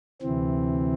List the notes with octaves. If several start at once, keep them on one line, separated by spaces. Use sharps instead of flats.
D2 C3 E3 C4